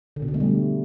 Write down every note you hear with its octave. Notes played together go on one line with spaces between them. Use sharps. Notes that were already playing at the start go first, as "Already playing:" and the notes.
D3
B2
D3
A3
G3